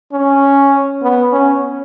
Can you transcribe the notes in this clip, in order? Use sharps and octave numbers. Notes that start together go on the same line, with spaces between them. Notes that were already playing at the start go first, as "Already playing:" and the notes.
C#4
B3
C#4